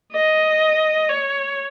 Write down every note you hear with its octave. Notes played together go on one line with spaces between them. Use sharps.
D#5
C#5